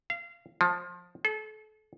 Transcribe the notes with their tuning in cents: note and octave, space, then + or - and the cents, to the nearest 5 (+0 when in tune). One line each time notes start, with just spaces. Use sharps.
F5 -25
F3 +20
A4 -35